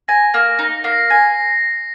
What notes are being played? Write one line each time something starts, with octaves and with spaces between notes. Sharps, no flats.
G#5 A#6
A#3
D#4
A#3 C7
A#6
C7
G#5 A#6